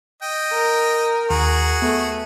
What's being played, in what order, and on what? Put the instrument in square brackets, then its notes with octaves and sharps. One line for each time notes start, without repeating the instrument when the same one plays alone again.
[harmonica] D#5 G5
[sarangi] A#4
[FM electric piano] D#2 [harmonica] F#4 G#4
[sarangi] A3 [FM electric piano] B3